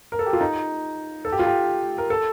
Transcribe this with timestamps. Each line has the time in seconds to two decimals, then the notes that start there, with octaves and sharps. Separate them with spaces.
0.12 A#4
0.19 A4
0.26 G4
0.33 F4
0.41 D#4
1.25 A4
1.32 G4
1.39 F4
1.47 G4
1.98 A#4
2.10 A4